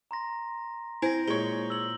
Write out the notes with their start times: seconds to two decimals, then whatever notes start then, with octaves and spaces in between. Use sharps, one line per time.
0.11 A#5 C6 A#6
1.02 C4 E4 G#5 G6 A#6
1.28 A#2 G#3 C#5 G7
1.70 E6 F#7